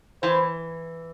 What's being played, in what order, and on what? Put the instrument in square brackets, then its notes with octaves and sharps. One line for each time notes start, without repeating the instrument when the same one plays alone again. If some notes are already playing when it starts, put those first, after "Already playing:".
[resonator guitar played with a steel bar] E3 [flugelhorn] C5